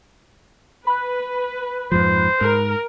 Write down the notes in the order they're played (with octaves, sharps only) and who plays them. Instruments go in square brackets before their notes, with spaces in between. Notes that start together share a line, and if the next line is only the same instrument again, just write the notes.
[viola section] B4 [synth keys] B5 F#6
[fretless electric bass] F2 G#2 F3 [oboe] C5
[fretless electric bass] G#2 [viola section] A#4